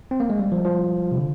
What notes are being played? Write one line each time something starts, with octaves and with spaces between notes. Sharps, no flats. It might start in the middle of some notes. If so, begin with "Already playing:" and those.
C4
A#3
G#3
G3
F3
F3
C3
D3